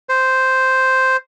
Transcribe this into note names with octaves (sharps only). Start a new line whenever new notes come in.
C5